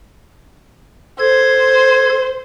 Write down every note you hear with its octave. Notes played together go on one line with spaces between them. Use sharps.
A4 C5 G#6